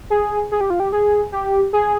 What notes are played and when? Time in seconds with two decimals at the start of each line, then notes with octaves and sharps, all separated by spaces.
0.10 G#4
0.52 G#4
0.61 G4
0.70 F4
0.80 G4
0.92 G#4
1.32 G4
1.73 G#4